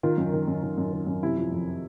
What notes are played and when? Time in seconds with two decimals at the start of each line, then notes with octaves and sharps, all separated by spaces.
0.03 D#3 F4
0.18 F#2
0.33 D#3
0.48 F#2
0.63 D#3
0.78 F#2
0.93 D#3
1.07 F#2
1.23 C3 E4
1.37 F3
1.52 F2